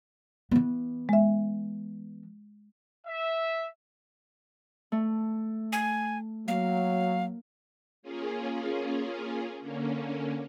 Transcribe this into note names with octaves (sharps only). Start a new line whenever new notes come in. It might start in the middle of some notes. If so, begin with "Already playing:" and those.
E3 B3
G#3 E5
E5
A3
G#5
F#3 A#3 F5
A#3 C#4 F4 G#4
D3 A#3 C#4